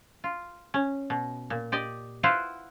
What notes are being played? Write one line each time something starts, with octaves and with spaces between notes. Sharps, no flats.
F4
C#4
B2
A#2
G4 D5 D#5
E4 F4 B4 C5 F5 F#5